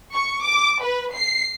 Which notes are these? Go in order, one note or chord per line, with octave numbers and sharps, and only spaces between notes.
C#6
D6
B4
C7